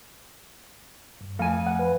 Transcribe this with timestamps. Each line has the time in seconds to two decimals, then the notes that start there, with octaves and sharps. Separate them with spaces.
1.21 G2
1.39 F2 A3 F5 G#5
1.67 F#5
1.79 B4